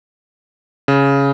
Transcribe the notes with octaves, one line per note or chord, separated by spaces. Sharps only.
C#3